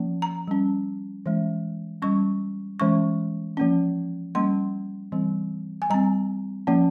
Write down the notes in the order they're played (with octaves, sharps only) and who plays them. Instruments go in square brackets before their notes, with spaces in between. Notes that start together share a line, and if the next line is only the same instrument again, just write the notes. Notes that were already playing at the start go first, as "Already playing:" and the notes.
Already playing: [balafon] F3 A#3 C#4
A#5
G3 C#4
E3 G#3 C#4
G3 C#4 C#6
E3 G#3 C#4 C#6
F3 A#3 C#4
G3 A#3 C#4 C6
E3 G3 C4
G#5
G3 C4 A#5
F3 A#3 C#4